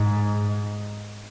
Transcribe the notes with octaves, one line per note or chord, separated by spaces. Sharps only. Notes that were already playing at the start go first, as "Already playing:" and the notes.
Already playing: G#2